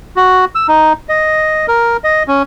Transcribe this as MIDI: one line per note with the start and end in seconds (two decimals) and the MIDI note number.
0.16 0.45 66
0.55 0.67 88
0.68 0.93 63
1.09 1.66 75
1.68 1.97 70
2.04 2.23 75
2.28 2.43 61